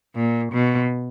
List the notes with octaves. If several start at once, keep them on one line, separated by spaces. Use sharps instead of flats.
A#2
B2